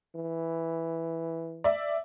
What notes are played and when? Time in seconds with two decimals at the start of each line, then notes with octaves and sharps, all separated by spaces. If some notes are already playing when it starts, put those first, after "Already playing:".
0.15 E3
1.64 D5 E5